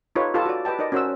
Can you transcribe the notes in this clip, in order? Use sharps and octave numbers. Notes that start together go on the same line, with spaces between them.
D#4 F4 G4 A4 B4 C#5
D#4 F4 G4 A4 B4 A5
F#4 D5
G4 B4 D#5 G5 A5
D#4 A#4 D5 D#5
C#4 F#4 A#4 C5 F#5 E6